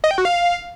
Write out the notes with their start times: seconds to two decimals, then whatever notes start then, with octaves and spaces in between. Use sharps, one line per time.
0.04 D#5
0.11 G5
0.18 F#4
0.25 F5